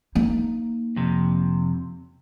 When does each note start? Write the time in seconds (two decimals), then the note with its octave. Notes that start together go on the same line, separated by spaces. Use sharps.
0.15 A#3 D#4
0.96 F2 C3